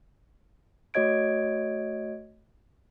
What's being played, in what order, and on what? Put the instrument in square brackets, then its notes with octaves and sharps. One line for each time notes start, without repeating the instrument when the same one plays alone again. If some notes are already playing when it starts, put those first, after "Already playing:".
[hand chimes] A3 F#4 C#5 D#5 G#6 D7